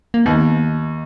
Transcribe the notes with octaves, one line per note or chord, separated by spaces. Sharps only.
A#3
D#2 B3